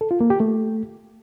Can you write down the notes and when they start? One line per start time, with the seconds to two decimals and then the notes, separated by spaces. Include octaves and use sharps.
0.01 A4
0.11 F4
0.21 A#3
0.30 G4
0.40 A3